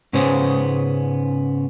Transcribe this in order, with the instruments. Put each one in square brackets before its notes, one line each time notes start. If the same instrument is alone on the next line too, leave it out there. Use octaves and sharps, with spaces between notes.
[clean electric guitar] G#2 C#3 B3 C#4 G#4 C5